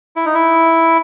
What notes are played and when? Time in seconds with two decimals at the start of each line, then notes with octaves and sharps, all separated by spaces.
0.16 E4
0.26 D#4
0.34 E4